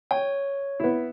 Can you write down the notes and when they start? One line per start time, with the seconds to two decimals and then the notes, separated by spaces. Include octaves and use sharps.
0.11 C#5 G5
0.80 B3 E4